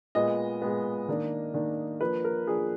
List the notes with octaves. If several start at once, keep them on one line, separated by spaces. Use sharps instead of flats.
A#2 G#3 B3 D#5
A#2 G#3 B3
D#3 A#3 D4
D#3 A#3 D4
F3 A#3 D4 B4
A#4
F3 A#3 D4 G#4